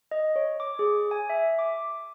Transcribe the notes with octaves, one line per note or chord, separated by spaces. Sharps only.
D#5
C#5
D6
G#4
G#5
E5
D6